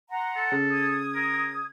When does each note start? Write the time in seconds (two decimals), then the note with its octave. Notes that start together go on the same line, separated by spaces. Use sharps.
0.10 F#5 A#5 C6
0.36 A4
0.52 C#3
0.70 D#6 G#6
1.15 A#4